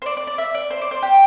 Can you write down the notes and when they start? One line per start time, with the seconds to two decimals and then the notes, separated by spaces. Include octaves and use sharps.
0.02 C5
0.06 D5
0.17 D5
0.27 D5
0.38 E5
0.54 D5
0.71 C5
0.81 D5
0.91 C5
1.03 G4